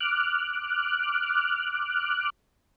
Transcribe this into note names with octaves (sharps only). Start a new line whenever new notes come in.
D6 F6 F#6